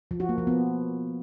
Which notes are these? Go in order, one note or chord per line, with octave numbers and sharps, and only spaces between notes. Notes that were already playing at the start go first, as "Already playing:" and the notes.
F3
F#4
A#3
F3
B3